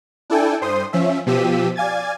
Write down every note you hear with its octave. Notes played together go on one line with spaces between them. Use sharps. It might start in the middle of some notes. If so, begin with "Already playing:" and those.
D4 E4 A4 G5 G#5
G2 C5 C6 D#6
F3 C#4 E5
B2 F3 G4 E6 B6 D#7
D5 F5 G#5 G#6 A6